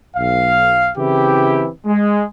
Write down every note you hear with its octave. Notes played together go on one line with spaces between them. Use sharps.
B1 F5
C#3 E3 C4 E4 G4
G#3